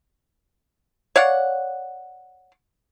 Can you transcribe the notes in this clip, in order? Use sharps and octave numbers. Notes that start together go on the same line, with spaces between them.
C#5 D5 F5 F#5